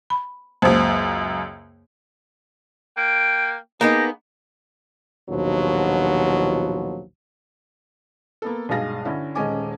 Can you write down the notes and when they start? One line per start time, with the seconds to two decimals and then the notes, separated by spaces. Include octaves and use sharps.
0.10 B5
0.62 C#2 F#2 A#3 C5 A5
2.97 A#3 G5 D7
3.81 A#3 B3 D#4 G4 G#4 A#6
5.29 A#1 D#2 B2 F3 F#3
8.42 A#3 B3 A4
8.69 B1 G2 G#3 G#4 F5 A#6
9.05 D3 C#4 E4
9.35 D#1 G#3 C#4 D#5 G#5 D6